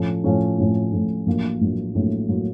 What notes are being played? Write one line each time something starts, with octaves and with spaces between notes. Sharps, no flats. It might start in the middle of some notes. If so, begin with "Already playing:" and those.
Already playing: A2 F3 A3 C#4
A2 F3 A3 C#4
A2 F3 A3 C#4
A2 F3 A3 C#4
A#1 A2 F#3 A#3
A#1 A2 F#3 A#3
A#1 A2 F#3 A#3
A2 F#3 A#3